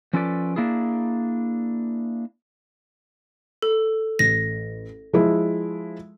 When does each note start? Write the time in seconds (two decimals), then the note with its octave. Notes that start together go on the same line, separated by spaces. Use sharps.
0.13 F3 C#4 F4 A4 B4 D5
0.56 A#3 D4 E4 G#4
3.62 A4
4.19 A1 A#6
5.13 F3 G#3 E4